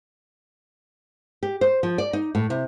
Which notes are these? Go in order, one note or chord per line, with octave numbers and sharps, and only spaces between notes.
G4
C5
F3
D5
D#4
A2
C3